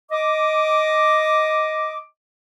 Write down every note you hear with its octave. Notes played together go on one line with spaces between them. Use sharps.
D#5 D6